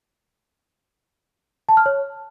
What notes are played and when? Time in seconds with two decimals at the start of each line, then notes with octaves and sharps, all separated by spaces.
1.69 A5
1.77 F6
1.86 C#5